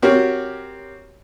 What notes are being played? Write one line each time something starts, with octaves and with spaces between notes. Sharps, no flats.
C4 F#4 G4 A#4 C#5